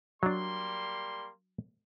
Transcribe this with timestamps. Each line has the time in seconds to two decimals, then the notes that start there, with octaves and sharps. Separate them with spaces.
0.23 F#3 G3 A#3 D4 C6